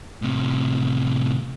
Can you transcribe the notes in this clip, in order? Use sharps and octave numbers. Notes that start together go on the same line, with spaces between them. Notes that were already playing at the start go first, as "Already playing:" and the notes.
A2 C3